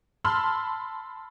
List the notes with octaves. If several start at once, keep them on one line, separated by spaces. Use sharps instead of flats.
A5 B5 C6 E6 F6